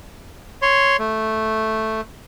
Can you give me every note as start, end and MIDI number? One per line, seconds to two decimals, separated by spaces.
0.62 0.97 73
0.62 0.97 84
0.99 2.01 57